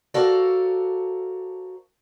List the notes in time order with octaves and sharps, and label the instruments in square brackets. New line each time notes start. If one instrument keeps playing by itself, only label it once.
[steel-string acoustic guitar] F#4 A4 A#4 C5 D5 F5